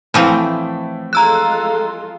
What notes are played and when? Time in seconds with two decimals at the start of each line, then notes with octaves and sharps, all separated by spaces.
0.14 A2 E3 F3 A3 C4
1.13 G#3 F4 A4 A#5 E6 F#6